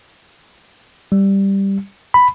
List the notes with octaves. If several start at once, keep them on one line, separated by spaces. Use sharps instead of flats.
G3
B5